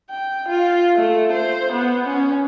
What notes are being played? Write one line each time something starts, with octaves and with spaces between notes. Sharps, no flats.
G5
F4
A3
C5
B3
C#4